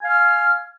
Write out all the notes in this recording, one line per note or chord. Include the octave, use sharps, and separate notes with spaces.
F5 G#5 F6